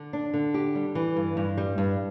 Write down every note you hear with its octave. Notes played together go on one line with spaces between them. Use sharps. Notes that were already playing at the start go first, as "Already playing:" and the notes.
Already playing: D3
D4
D3
G4
G3
E3
G2
G2
G3
G2